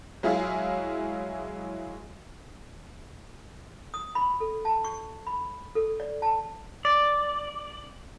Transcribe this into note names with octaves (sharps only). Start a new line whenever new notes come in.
F#3 G#3 E4 G#4 E5 F5
D#6
B5
A4
A5
C#6
B5
A4
D5
A5
D5